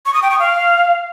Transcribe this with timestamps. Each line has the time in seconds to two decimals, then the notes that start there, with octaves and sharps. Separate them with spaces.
0.06 C#6
0.14 D#6
0.22 G5
0.31 C#6
0.39 F5